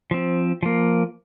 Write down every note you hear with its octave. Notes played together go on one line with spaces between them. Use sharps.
F3 C4
F3 A#3